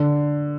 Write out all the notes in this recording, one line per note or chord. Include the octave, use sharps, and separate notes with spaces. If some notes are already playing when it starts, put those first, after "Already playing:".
Already playing: D3